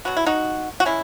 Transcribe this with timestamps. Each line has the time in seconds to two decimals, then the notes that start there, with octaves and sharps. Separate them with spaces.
0.05 B2 F#3 B3 F#4
0.17 E4
0.26 D#4 F#4
0.80 F#4
0.86 G#3 C#4 E4